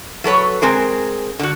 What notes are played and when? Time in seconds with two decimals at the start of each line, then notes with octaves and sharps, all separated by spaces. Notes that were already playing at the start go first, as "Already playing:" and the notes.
0.24 F#3 A4 B4 C#5
0.62 G#3 C4 G#4 A#4
1.39 D3 F#4